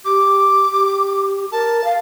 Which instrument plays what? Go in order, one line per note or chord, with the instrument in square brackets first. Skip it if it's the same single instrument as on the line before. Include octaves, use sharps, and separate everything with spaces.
[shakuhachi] G4 [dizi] D6
[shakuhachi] G4
[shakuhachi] A#4 [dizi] A5
[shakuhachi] F5